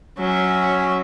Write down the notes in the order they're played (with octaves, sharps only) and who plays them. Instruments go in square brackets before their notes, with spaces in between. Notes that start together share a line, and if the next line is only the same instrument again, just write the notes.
[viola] F#3 E5 [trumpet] C#4